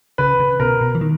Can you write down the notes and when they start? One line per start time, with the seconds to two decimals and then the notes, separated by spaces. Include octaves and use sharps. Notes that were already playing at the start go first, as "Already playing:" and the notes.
0.18 C#3 B4
0.40 C#3
0.60 B2 A#4
0.81 B2
0.95 E3
1.01 D#3